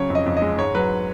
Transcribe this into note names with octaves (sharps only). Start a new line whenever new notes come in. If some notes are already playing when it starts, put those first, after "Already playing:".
Already playing: C#3 F#3 C#5
F2
D#5
F2
D#5
G#3
G#2 C#5
F#3 B4